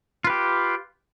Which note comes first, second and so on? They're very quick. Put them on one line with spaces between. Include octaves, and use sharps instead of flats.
F4 B4 G4